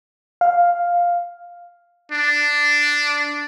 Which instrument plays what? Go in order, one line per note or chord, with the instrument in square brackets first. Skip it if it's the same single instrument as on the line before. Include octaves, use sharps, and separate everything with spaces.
[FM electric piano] F5
[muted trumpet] D4